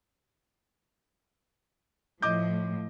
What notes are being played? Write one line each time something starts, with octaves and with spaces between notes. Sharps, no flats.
A2 F3 D#5 D6 G6